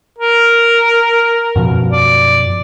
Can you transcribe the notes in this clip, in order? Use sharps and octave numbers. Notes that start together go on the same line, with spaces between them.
A#4
F#2 B2 F3
D5